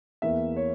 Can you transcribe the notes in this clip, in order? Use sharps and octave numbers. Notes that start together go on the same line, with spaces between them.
E2 E3 A#3 E5
C#5